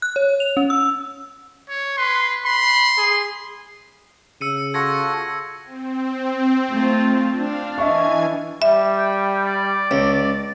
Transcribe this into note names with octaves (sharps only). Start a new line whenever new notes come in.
F#6
C#5
F7
C#4
E6
C#5
B4 C6
B5 C6
G#4
C#3 E6 C#7 D#7
F4 F#4 A4 G#6 A#6 C#7
C4
A3 F4
D4 F5
E3 D#5 E5 G#5 C#6 G#6
G3 E5
G5
D5
C#2